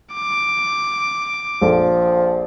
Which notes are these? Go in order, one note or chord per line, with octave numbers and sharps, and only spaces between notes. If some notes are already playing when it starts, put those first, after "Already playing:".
D6
A#1 F3 A4